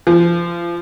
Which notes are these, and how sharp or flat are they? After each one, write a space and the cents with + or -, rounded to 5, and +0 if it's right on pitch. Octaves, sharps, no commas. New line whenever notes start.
F3 -30